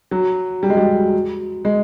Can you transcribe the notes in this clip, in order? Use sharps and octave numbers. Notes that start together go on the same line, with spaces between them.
F#3
G3
G#3
G3
G#3